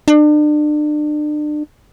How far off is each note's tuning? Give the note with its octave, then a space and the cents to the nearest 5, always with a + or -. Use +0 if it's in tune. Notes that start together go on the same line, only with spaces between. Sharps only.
D4 +35